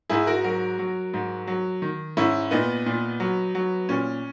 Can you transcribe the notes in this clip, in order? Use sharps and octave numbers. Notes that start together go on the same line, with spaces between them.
G#2 E4 G#4
F#4 A#4
F#3 F#4 A#4
F#3
G#2
F#3
D#3
G#2 C#4 E4
A#2 B3 D#4
A#2
F#3
F#3
A#2 C#4